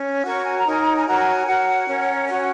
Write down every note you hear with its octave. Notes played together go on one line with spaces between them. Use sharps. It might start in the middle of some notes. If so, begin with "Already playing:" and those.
Already playing: C#4
F#4 A#4 C#5 C#6
G#5
A#5
D#4 A#4 C#5 G#5
A#5
G#5
F#4 A#4 C#5 A#5
G#5
F#4 A#4 C#5 F#5
C#4 A#4 C#5
C#4 F#4 C#5 F#5